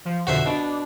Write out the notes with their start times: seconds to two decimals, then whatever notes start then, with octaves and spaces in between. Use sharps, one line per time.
0.05 F3
0.27 F2 B2 D3 F#4 C5 E5
0.46 B2 D4